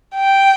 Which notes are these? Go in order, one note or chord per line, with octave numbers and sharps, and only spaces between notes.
G5